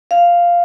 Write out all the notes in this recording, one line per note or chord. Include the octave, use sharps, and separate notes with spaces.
F5